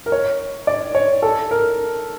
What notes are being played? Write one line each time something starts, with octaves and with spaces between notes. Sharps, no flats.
A#4
C#5
D5
C#5
A4
A#4